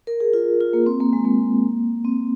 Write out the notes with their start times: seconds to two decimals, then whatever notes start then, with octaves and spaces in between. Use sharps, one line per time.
0.07 A#4
0.20 G#4
0.33 F4
0.61 F4
0.73 A#3
0.86 C4
1.00 A#3
1.13 G#3
1.25 A#3
2.05 C4